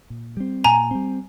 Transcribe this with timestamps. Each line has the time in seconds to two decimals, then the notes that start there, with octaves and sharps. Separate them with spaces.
0.10 A#2
0.37 G3 C4
0.64 A#2 G#5 A#5
0.91 G3 C4